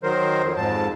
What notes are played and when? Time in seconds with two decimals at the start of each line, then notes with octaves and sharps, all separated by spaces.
0.04 D#3 F#3 A#4 C5
0.42 F2
0.57 F2 G#2 A5